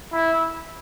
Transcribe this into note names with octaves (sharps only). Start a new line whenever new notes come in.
E4